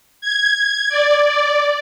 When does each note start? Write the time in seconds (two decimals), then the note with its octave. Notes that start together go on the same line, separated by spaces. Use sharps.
0.21 G#6
0.89 D5
1.24 D5